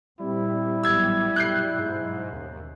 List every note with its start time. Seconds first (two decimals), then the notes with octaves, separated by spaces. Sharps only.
0.20 A#2 G3 C4 E4
0.83 A1 F#3 B3 E6 G#6
1.36 G2 B2 F#3 F#6 G6 C7
1.79 G#2
2.32 D#2 C#3